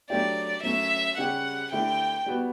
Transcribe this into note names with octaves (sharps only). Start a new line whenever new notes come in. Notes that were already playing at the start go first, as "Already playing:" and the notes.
F#3 A3 D4 G4 D5
F#3 A3 C#4 E5
C#3 G3 C#4 G4 F#5
D3 A3 E4 G4 G5
G3 B3 F#4